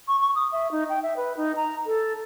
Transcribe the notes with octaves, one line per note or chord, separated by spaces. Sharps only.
C#6
C#6
D#6
E5
D#4
G5
E5
B4
D#4
A#5
A4